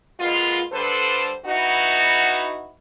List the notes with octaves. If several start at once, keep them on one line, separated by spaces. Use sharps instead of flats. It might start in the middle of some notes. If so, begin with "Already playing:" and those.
A#2 G#3 B3 F4
D3 G3 A4 B4 C5
B3 D#4 E4 F#4